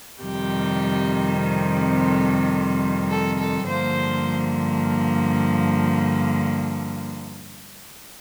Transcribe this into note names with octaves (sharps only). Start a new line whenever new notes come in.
F2 C3 D#3 G3 G4
A4
A4
A4
G2 D3 F3 A#3 C5